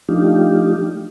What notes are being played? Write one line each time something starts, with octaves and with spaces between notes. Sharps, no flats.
F3 A3 D4 D#4 F4 G4